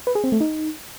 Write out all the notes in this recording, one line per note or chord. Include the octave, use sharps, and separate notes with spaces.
B4
G#4
C4
A3
D#4